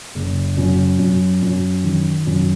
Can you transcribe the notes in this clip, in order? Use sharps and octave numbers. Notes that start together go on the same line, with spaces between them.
F#1
F#2
F#2
F#2
D#3
F#2